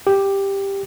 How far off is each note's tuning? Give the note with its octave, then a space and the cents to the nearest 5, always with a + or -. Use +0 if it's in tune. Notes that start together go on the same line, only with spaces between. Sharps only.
G4 +5